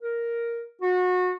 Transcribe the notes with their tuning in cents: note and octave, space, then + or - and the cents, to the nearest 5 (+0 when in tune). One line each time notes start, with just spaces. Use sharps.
A#4 +0
F#4 -25